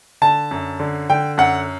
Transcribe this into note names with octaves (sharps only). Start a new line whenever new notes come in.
D3 A5
F#2
D3
D3 G5
F#2 F#5